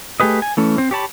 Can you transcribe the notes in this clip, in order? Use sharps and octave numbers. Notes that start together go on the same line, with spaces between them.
A3 G4 G#4 B4 D#5
G#5
E3 A3 C#4
C4 C5
G4 C#5 A5 B5